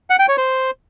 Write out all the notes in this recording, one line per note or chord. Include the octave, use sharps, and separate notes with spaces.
F#5
G5
C#5
C5